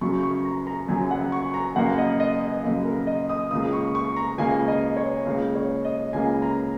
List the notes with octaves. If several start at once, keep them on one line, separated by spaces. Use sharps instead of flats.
F#2 C#3 F#3 C#6
C#6
A#5
A#5
F#2 C#3 F#3 G#5
F#5
C#6
A#5
F#2 C#3 A#3 F#5
D#5
D#5
D#5
F#2 C#3 A#3 A#4
A#4
D#5
D#6
C#2 C#3 A#3 D#6
C#6
C#6
A#5
C#2 C#3 A#3 G#5
D#5
C#5
C#2 C#3 A#3 A#4
C#5
D#5
C#2 C#3 A#3 G#5
A#5